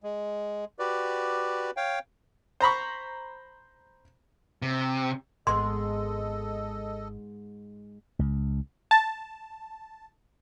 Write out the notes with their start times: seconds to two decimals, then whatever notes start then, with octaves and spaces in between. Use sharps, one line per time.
0.03 G#3
0.79 F#4 G4 B4 D5
1.77 C#5 F5 G5
2.60 C5 A#5 B5 C#6
4.62 C3
5.47 G#1 G#2 G#3 B3 A4 D#5 C6
8.19 C#2
8.91 A5